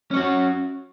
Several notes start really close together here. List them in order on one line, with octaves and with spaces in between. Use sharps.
C#4 C#5 F#4